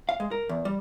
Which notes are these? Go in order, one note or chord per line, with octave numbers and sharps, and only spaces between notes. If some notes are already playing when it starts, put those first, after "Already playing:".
F5
G#3
A#4
E2
G3